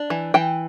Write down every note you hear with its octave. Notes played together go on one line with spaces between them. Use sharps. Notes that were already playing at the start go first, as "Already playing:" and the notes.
Already playing: D4
E3
E3 G5